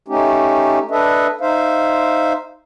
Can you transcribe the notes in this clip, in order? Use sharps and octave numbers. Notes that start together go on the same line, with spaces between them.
A3 C#4 D#4 G4
D4 A4 B4 D#5 E5
D#4 C5 E5 F5